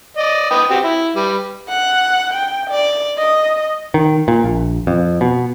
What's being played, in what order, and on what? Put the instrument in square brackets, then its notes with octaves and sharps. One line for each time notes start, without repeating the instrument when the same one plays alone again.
[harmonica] D5 D#5
B4 G5 D#6
C4 F#4 G4
E4
G3 B4
[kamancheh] F#5
G5
D5
D#5
[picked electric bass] D#3
A#2
A#1
F2
B2